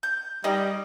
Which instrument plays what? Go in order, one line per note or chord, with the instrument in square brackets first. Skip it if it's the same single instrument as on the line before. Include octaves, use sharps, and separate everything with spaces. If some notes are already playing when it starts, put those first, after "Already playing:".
[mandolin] G6
[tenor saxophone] G3 [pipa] D#4 G4 D#5 [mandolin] G#4